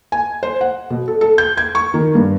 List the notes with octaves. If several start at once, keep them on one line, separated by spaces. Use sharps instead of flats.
G#5
C5
F#5
B2
A4
A4
G6
G#6
C#6
D#3
G2